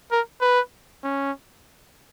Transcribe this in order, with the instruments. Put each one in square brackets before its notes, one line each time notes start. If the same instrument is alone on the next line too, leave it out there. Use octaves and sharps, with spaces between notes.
[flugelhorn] A#4
B4
C#4